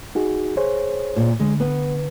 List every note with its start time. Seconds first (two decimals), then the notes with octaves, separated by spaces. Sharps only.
0.15 D#4 F#4 G#4
0.57 G#4 C5 C#5
1.16 A#2
1.40 D3 G#3
1.60 B3